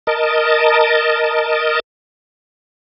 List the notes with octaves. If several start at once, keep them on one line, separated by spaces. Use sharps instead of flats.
A#4 D#5 A5